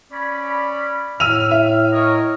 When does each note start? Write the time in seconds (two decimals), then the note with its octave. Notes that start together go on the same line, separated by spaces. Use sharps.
0.12 C#4 D5 B5
1.20 A2 E6 F6 D#7 F7
1.51 E5
1.92 A#4 C#5 D#5